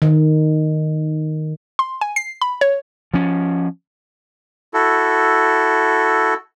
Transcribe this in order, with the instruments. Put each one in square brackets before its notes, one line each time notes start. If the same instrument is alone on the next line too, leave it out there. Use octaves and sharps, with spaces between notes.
[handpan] D#3
[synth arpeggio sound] C6
G#5
C7
B5
C#5
[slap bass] F3 C#4
[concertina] E4 F#4 A4